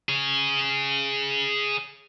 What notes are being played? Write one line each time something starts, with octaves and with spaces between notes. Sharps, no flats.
G#4 C#5